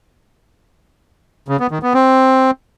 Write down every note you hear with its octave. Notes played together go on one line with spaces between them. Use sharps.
C#3
B3
D#3
B3
C4